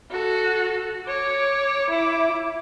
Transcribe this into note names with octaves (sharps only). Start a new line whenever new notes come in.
F#4 A4
C#5 D6
E4 D6